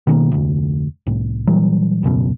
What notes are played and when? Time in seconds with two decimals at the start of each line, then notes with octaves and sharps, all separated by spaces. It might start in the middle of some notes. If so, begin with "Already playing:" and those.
0.07 B2 D#3 G#3 A#3
0.32 F1 D2
1.07 C2 A2
1.47 A#2 E3 F#3 G3
2.03 D#1 C#2 F#2 B2